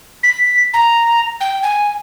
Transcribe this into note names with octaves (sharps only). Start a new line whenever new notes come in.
B6
A#5
G5
G#5